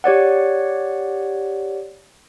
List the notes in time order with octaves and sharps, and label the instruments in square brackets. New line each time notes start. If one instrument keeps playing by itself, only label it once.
[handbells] G4 C#5 D5 F#5